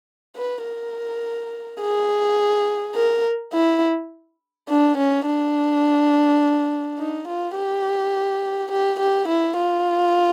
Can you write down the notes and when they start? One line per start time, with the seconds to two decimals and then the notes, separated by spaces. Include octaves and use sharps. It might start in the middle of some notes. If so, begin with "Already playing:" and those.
0.37 B4
0.65 A#4
1.81 G#4
2.95 A#4
3.53 E4
4.69 D4
4.97 C#4
5.26 D4
6.99 D#4
7.28 F4
7.56 G4
8.71 G4
9.00 G4
9.28 E4
9.57 F4